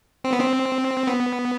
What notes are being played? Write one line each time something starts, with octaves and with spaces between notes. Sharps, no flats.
C4
B3
C4
B3